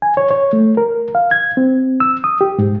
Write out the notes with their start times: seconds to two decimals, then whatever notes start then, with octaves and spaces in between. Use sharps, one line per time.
0.02 G#5
0.17 C#5
0.31 C#5
0.53 A3
0.77 A#4
1.15 F5
1.31 G#6
1.57 C4
2.00 E6
2.24 D#6
2.41 G4
2.58 G#2